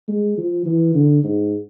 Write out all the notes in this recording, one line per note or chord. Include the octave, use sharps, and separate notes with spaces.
G#3
F3
E3
D3
G#2